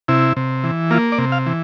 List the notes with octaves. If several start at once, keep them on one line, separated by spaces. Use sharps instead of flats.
C3 E4
C3
E3
A#3 F4
D5
C3
F5
E3